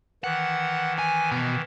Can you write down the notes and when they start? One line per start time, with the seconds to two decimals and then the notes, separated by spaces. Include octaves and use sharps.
0.24 D#3 E3 F#5
0.99 G#5
1.31 B2